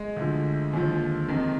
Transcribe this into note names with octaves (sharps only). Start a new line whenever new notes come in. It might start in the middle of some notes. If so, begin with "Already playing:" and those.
Already playing: G#3
D2 D3 F3
D#2 D3 F3
F2 C3 D#3